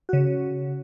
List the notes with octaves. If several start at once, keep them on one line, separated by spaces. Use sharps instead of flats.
C#3 F#4